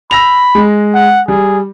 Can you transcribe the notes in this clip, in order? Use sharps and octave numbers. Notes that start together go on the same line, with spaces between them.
B5 E6 A#6 F7
G#3
F#5
G3 G#4